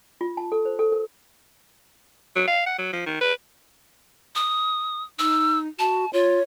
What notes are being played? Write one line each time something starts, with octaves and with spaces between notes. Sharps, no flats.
F4
A5
A4
C5
A4
A#4
F#3
F5
F#5
F#3
F3
D#3
B4
D#6
D#4 E6
F#4 A5
F4 C#5